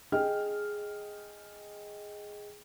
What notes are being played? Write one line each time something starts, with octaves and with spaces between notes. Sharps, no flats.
G#4 D#5 G5 F6